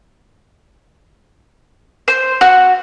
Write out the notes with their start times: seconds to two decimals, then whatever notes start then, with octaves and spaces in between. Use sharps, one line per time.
2.08 C5
2.41 F#4